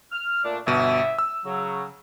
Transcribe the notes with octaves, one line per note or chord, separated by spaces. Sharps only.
F6
A#2 A3 D4
G1 B2 E5 D#7
E6
C#3 F#3